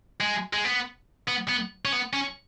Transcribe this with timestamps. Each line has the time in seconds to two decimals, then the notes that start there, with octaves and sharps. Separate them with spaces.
0.21 G#3
0.53 G#3
0.65 B3
1.28 B3
1.49 B3
1.85 C#4
1.93 B3
2.13 C#4